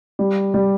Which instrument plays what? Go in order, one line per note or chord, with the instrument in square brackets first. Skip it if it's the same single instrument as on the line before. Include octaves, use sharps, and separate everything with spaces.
[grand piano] G3
G3